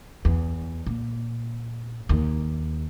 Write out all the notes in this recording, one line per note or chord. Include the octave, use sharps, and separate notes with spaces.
E2
A#2
D#2